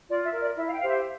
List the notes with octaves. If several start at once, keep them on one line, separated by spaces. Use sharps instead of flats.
F4 D5
E5
A#4
D5
E4 E5
F5
G5
G4 C5 F5
E5